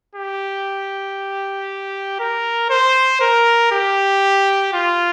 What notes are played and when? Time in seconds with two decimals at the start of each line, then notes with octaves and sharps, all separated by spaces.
0.15 G4
2.19 A#4
2.70 C5
3.21 A#4
3.72 G4
4.73 F4